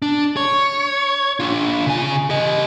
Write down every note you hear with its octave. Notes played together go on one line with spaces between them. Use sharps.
D4
C#5
D4 F4
C#3 G#5
G4 D#5